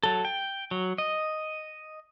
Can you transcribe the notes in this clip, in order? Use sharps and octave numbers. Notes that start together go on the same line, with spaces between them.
F#3 A4
G5
F#3
D#5